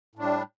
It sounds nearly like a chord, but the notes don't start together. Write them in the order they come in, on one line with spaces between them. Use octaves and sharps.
A2 D4 G3